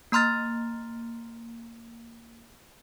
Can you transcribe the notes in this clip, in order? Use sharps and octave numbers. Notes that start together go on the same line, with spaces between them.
A#3 A#5 C6 F6 A6